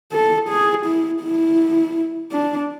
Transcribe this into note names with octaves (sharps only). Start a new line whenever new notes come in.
A4
G#4
E4
E4
D4